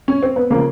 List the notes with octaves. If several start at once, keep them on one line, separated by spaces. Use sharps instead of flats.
C#4
C4
B3
C#3 F3 A#3